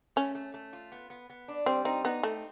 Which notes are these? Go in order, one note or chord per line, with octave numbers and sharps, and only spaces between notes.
A3 C#4
A3
A3
F4
B3
B3
B3
D4
G3 C4
C4 D#4
B3 D#4
A3 C4